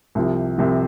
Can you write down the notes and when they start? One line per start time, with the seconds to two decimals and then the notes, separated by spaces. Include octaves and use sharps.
0.15 C2 C3 F3
0.58 C2 C3 F3